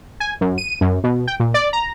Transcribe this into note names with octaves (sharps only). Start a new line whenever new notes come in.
G#5
F#2
D#7
F#2
B2
G5
A#2
D5
A#5